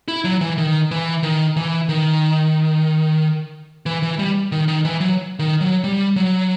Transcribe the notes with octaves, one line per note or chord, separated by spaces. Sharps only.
E4
F#3
E3
D#3
E3
D#3
E3
D#3
E3
E3
G3
D#3
D#3
E3
F#3
D#3
F#3
G3
F#3